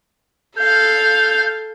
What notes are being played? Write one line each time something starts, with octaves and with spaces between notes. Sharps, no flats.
A4 F5 G6